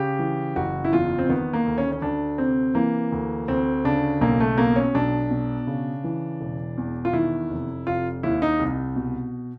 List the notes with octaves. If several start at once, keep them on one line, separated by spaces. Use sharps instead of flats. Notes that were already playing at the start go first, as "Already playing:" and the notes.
Already playing: C#3 G4
E3
F#1 F#4
E4
E2 F4
C4
D#3 B3
A#3
D2
C#4
C#4
D2 D4
C3 C4
E3 A#3
D2
D2 C4
C#3 D4
B1 A#3
A3
B2 A#3
C#4
B1 D4
B2
C#3
E3
E1
E2
F4
D#3 E4
F1
F1 F4
D#2 E4
D#4
C2
B2